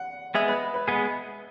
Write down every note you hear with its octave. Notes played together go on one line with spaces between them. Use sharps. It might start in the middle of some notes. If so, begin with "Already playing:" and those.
Already playing: F#5
G#3 B3 G#4 E5
B4
B4
G#3 B3 G#4